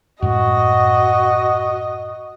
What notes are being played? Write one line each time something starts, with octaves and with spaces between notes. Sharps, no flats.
F#2 A2 G#3 F#4 D#5